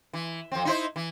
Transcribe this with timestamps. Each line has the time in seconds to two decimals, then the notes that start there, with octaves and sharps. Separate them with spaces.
0.13 E3
0.52 F2 C4
0.65 D#4 E4 C5
0.96 E3